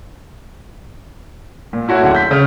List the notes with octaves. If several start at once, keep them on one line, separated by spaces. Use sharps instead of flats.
A#2
A3 E4 F#4 C#5 F#5
D1 D3 F#5
G6 B6
C#3 F6